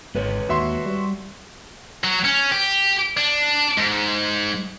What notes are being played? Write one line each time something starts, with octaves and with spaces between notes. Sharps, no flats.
G#1 G#3 B4 C#5
D#2 F#4 E5 C6
G3
F#3
C#4
G4
D4
G#2